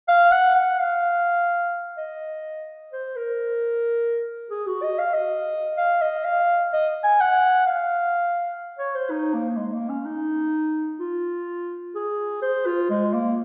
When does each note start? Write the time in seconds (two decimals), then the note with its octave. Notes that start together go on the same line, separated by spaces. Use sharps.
0.08 F5
0.31 F#5
0.55 F#5
0.79 F5
1.97 D#5
2.93 C5
3.16 A#4
4.51 G#4
4.67 F#4
4.82 D#5
4.98 F5
5.14 D#5
5.78 F5
6.02 D#5
6.25 F5
6.73 D#5
7.04 G#5
7.20 F#5
7.67 F5
8.79 C#5
8.95 C5
9.10 D#4
9.34 A#3
9.57 G#3
9.73 A#3
9.89 C#4
10.05 D#4
10.99 F4
11.95 G#4
12.42 C5
12.66 F4
12.90 G#3
13.13 A#3